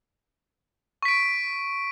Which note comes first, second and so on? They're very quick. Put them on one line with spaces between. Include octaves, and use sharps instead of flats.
C#6 B6 D7